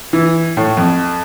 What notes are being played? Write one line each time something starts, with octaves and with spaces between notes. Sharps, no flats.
E3
A2
F2